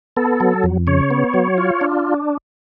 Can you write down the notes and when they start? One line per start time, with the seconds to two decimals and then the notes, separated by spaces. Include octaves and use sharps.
0.17 B3 A4
0.40 F#3
0.64 F2
0.87 C#3 C#5
1.11 B3
1.34 F#3
1.58 F4
1.81 D4